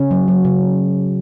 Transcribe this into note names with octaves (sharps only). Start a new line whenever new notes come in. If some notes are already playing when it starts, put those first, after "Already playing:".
Already playing: C#3 C#4
F#3
F#3
C#3